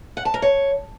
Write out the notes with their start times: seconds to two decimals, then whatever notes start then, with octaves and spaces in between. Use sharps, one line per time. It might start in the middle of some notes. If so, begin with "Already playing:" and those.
0.17 F#5
0.25 A5
0.34 A#4
0.42 C#5